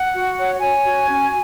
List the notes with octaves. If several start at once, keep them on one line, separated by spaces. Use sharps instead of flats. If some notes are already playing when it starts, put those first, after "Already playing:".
Already playing: F#5
F#4
C#5
C#5 G#5
F#4
C#4